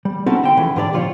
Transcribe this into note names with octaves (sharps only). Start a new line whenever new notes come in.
G3
C4 C#4 D#4 E4 F#4 A4
D3 G5
D2 C#3 E3 F3 A3
G#2 D3 D4 G4 C5 D5
C#2 A#2 F3 F4 C5 C#5